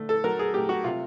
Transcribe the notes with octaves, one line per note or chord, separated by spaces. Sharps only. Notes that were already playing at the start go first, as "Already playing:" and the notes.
Already playing: D3 A3
A4
F#3 A#4
G#4
A3 G4
F#4
C3 F4